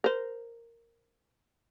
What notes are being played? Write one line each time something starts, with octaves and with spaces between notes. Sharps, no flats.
A#4 C5